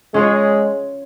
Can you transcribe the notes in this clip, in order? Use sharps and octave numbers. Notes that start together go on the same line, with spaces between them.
G#3 C#4 F4 C#5